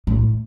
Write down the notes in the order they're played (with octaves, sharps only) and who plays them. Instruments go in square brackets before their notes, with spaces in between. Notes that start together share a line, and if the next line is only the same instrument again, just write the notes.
[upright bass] A2